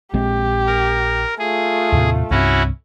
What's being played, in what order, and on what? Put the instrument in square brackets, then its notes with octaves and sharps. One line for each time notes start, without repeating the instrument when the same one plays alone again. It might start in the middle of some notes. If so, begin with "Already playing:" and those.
[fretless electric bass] A#1 G#3 C4 [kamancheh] G4
[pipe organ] A#4
[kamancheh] A3 F4 [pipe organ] G#4
[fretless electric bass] D#2 A2 C3
[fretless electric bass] C2 G2 C4 [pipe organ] C#4 E4 F#4